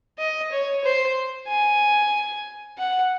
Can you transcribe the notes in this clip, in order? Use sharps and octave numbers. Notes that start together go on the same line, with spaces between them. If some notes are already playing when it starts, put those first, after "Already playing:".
D#5
C#5
C5
G#5
F#5